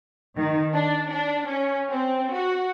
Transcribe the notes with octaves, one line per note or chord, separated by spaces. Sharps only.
D#3
D4
D4
C#4
C4
F#4